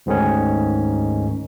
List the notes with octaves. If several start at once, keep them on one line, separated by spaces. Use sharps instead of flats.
D2 G#2 D#3 C#4